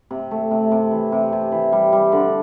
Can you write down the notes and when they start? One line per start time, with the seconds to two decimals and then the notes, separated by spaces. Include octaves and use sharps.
0.11 C3
0.31 A3
0.51 C3
0.72 C3
0.91 E3
1.12 C3
1.33 C3
1.52 E3
1.73 G3
1.93 G3
2.12 D3